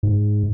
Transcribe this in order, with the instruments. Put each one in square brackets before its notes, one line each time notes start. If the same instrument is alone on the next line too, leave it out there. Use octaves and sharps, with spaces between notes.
[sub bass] G#2